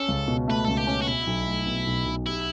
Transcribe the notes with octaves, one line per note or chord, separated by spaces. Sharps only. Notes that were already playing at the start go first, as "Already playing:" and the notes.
Already playing: C#4 A4
C#2
B2
A3 B4
C#2 A4
G4
C#4
F#4
B2 E4
B1
A3
B2
B1
B1
E4 G4